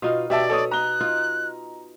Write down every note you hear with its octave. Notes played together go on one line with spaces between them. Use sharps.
B2 D#4 F4 F5
B2 G4 D5 E5 A5
A4 C#5 D#6
A#5 F#6 G7
D#4 F4